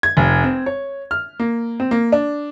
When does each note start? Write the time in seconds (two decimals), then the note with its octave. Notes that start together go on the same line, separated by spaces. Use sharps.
0.03 G#6
0.17 F1
0.44 C4
0.66 C#5
1.11 F6
1.40 A#3
1.80 C4
1.91 A#3
2.12 D4